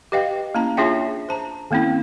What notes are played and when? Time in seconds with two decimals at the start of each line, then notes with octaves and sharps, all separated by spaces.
0.12 G4 B4 D#5 F5 G5
0.55 A#3 C#4 E4 A5 A#5
0.77 D4 F4 G#4 C#5 E5 G5
1.29 C5 A5 A#5
1.71 D#3 A#3 C4 C#4 E4